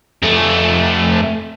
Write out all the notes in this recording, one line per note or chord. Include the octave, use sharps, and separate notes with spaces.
F2 A3